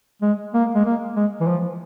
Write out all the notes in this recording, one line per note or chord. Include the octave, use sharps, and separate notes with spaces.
G#3
A#3
G#3
A#3
G#3
E3
F3